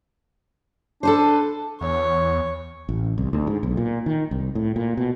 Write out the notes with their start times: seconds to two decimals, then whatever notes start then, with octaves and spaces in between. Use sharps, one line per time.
1.03 D4 A4 B4 C5
1.81 E2 C#5
2.89 A1
3.18 C2
3.33 D2
3.47 G#2
3.63 B1
3.77 A#2
4.06 D#3
4.31 C2
4.55 A2
4.76 A#2
4.97 B2